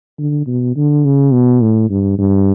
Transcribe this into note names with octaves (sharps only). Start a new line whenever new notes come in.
D3
B2
D3
C#3
B2
A2
G2
G2